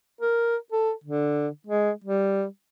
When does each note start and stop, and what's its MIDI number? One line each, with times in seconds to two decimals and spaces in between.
0.21 0.56 70
0.72 0.91 69
1.04 1.48 50
1.67 1.91 56
2.04 2.45 55